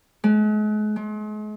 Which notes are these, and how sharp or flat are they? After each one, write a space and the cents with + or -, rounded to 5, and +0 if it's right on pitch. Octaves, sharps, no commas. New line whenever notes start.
G#3 +40
G#3 +40